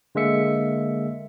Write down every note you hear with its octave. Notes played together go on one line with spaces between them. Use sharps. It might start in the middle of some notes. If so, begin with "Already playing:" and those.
D3 G#3 A#3 E5 C#7